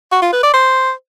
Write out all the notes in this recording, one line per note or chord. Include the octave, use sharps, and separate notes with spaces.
F#4
F4
B4
D5
C5